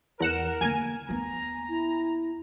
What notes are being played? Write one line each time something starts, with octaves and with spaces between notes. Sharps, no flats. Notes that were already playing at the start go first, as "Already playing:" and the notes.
E2 A#4 F#5 E7
D3 A#3 G#5
D#2 B3 A#5
E4